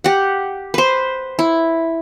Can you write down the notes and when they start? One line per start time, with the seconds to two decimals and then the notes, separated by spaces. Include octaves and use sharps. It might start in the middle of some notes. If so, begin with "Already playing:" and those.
0.04 G4 F#5
0.74 B4 C5
1.39 E4